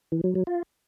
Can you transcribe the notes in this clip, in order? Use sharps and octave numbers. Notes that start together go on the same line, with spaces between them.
E3
F#3
F#3
F4